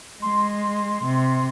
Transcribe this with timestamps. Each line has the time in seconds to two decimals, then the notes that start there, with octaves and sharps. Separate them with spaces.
0.22 G#3 C6
1.04 C3